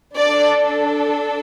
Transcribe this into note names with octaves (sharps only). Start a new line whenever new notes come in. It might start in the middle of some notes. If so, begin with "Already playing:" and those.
D4 A4 D5